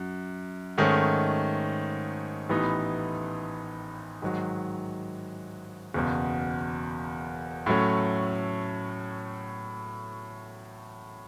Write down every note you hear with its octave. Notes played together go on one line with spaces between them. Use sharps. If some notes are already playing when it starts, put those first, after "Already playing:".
Already playing: F#2
G#2 D#3 A3 C#4
A1 A2 E3 B3 D#4
G#2 D#3 F#3
F#1 E2 B2
A2 F#3 A3 C#4